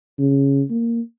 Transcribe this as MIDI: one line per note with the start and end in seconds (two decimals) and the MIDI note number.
0.19 0.62 49
0.70 1.01 58